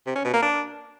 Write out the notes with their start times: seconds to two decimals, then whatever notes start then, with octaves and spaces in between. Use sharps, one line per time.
0.06 C3
0.15 C#4
0.24 B2
0.33 A#3
0.42 D4